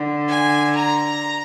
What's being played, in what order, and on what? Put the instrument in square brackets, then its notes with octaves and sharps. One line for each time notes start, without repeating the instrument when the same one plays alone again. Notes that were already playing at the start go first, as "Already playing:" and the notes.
Already playing: [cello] D3
[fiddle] G#5
A#5